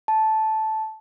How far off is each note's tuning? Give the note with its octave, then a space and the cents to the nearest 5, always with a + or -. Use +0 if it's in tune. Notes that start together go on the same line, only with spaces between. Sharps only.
A5 -10